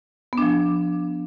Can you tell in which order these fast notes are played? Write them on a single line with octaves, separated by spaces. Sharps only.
B3 D4 F3